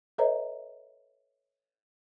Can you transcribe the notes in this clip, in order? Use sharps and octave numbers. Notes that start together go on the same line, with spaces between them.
A4 B4 C#5 D#5 E5 A#5